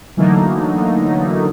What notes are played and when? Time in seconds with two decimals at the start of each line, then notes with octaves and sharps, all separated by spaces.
0.17 D3 E3 F#3 A3 A#3 D#4